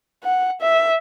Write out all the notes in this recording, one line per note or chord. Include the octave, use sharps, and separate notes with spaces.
F#5
E5